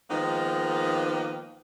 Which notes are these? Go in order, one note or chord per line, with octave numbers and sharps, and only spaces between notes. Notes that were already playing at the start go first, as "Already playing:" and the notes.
D#3 F3 G#3 A#3 B3